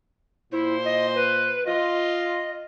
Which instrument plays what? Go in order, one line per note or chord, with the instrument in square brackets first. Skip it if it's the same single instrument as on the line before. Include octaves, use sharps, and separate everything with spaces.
[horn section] A#2 C5 [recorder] E4
[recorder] D#5
B4
[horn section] F4 [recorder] D#5